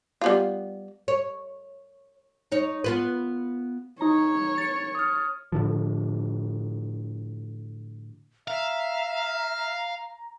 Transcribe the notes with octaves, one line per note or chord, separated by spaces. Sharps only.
G3 B3 F4
C#5
D#4 C#5
B3 F4 B4
D#4 C#5 A#5
A6 C#7
D#6 F6
A2 D3 F3
E5 F5 A#5